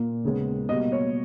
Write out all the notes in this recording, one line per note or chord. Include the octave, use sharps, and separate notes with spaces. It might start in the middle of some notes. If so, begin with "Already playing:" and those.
Already playing: A#2 A#3
D#2 C#3 G#3 B3
B2 G3 A#3 D#5
C#5